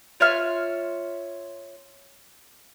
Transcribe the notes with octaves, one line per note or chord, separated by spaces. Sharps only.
F4 C#5 E5 F6